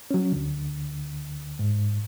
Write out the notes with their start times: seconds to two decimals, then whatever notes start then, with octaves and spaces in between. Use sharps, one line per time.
0.11 F#3 C#4
0.32 D2 D3
1.59 G#2